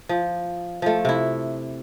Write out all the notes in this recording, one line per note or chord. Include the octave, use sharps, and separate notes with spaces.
F3
F3 A3
C3 E4